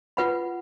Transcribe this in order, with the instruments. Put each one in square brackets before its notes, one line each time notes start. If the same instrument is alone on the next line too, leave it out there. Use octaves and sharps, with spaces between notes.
[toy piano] F4 B4 F#5 B5